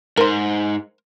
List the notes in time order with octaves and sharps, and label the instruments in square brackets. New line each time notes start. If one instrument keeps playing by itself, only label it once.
[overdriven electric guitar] G#2 [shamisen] A#4 C5